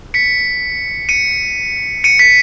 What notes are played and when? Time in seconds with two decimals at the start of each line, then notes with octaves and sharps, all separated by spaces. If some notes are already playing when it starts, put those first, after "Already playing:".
0.14 B6 C#7
1.09 C#7 D#7
2.04 C#7 D#7
2.19 B6 C#7